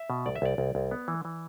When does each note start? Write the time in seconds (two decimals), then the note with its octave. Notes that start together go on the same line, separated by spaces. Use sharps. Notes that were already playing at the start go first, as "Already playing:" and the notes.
Already playing: E5
0.10 B2
0.26 C2 D5
0.35 E5
0.42 C2 D5
0.58 C2
0.75 C2
0.91 B3
1.08 E3
1.25 E3